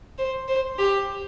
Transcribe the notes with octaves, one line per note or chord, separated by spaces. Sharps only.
C5
C5
G4